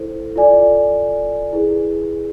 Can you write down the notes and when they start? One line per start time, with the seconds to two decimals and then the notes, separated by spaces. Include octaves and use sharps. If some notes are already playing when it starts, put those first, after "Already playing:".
Already playing: E4 A4 C5
0.36 F4 A4 D5 G#5
1.53 E4 G#4 B4